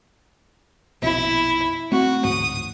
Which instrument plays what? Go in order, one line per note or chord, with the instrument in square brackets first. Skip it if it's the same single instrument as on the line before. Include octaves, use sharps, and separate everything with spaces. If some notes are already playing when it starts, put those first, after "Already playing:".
[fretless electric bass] A#1 F2 B2 [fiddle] E4
[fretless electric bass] A3 C4 [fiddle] F#4
[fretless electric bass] A1 D2 G#2 [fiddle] D#6